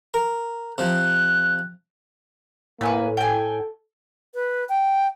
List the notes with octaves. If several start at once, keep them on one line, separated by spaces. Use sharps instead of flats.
A#4
C3 F3 F#6
A2 A#3 B4 G#5 B5
A4 G5 G#5
B4
G5